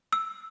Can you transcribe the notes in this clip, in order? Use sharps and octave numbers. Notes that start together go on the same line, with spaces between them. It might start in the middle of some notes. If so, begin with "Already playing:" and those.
E6